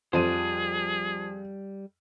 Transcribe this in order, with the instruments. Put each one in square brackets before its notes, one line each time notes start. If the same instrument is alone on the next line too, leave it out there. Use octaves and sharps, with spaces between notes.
[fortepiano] F2 [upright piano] F3 D#7 [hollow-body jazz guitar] G3 F4 C5 [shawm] G#4